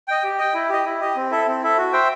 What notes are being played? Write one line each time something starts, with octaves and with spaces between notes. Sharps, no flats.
D#5 G5
G4
D#5 G5
E4
G4 D#5
E4
G4 D#5
C4
E4 A4 E5
C4
E4 A4 E5
F#4
C5 E5 G5